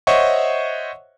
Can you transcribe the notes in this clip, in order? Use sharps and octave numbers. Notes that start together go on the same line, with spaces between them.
C5 C#5 D#5 E5 F#5 C#6